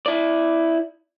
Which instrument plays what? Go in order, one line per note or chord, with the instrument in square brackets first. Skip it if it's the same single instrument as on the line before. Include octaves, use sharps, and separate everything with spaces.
[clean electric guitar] E4 D5